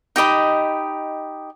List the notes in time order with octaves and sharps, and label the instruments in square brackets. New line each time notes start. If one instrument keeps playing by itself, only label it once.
[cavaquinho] D#4 G4 D#5 B5